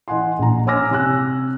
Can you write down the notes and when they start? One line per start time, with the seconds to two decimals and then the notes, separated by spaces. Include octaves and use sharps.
0.08 E3 D#5 F#5 G#5 C6
0.39 A#1 A#5
0.67 C#5 G#5 D6 E6 F6 A#6
0.91 C3 G#5 E6 F#6